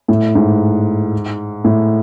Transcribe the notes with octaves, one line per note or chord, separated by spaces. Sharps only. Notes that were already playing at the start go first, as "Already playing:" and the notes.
A2
G#2
A2